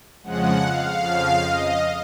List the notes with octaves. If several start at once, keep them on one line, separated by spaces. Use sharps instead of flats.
F2 C#3 F3 G#3 F#5
F5
F2 C#3 F3
D#5